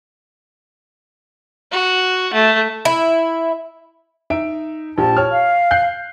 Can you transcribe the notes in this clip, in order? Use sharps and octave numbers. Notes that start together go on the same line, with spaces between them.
F#4
A3
E4
D#4 E5 D7
A#1 G4 A5
C#5 F6
F5
F#6 G6 C7